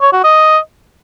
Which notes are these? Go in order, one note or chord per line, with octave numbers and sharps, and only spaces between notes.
C#5
F#4
D#5